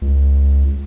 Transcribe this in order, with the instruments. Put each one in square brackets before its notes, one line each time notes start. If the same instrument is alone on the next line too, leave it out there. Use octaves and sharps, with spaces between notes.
[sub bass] C#2